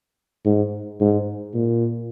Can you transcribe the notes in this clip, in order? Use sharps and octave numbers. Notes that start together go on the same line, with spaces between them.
G#2
G#2
A#2